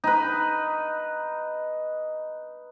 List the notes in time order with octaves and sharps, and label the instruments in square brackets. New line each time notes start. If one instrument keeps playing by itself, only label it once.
[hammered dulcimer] D#4 B4